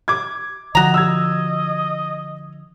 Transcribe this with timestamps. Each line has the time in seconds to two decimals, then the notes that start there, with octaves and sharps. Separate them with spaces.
0.08 D6 G#6
0.75 D3 F3 F#4 D#5 A#5
0.94 E6 G#6